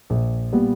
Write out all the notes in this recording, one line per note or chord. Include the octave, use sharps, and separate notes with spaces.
A#1
A#2 G3 B3